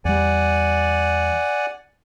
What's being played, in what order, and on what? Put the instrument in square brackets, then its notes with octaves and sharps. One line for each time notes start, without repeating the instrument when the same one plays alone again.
[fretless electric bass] E2 G3 [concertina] D5 F#5 G#5